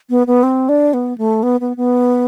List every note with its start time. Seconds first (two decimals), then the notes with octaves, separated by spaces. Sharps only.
0.10 B3
0.27 B3
0.43 C4
0.69 D4
0.93 B3
1.18 A3
1.43 B3
1.60 B3
1.77 B3